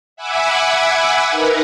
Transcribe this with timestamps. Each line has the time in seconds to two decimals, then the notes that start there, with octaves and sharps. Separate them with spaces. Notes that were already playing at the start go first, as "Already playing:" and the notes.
0.16 E5 F#5 G#5 B5 D6 E6
1.30 D#4 A#4 B4